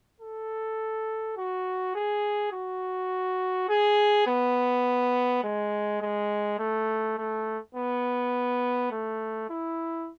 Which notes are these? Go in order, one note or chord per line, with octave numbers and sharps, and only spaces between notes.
A4
F#4
G#4
F#4
G#4
B3
G#3
G#3
A3
A3
B3
A3
E4